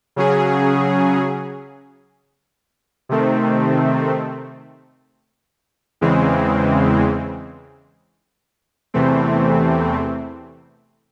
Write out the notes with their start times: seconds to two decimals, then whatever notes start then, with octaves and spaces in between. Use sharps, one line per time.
0.16 C#3 F#3 C#4 G#4
3.09 C3 D#3 A3 C4
6.01 E2 C#3 E3 G#3 C4
8.94 E2 C3 E3 A3 C4